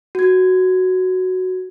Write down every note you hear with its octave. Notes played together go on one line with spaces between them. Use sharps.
F#4 G#6